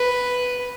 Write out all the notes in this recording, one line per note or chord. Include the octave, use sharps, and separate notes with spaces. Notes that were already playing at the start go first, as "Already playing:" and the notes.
Already playing: B4